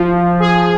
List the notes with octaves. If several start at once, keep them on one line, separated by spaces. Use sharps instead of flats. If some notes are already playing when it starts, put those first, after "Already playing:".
Already playing: F3
G#4